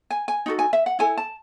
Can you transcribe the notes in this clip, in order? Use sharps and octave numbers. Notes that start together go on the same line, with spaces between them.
G#5
G#5
D#4 F#4 A4
G#5
E5
F#5
E4 A4 G#5
A5